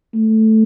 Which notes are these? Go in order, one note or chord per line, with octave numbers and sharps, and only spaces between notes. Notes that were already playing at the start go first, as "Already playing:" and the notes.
A3